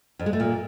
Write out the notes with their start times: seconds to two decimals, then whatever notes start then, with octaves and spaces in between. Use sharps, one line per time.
0.19 F2
0.26 G#3
0.33 A3
0.40 A#2